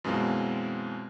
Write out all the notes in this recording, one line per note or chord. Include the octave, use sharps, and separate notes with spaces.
F#2 B2 E3 G#3 C4 F4